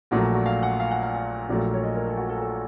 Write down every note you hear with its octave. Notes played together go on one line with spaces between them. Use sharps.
A#1 A#2 F#3 A3 F#4
F#4
F5
F#5
F5
F#5
F5
F5
A#1 A#2 F#3 A3
C#5
D#5
A#4
A4
F#4
A4
A4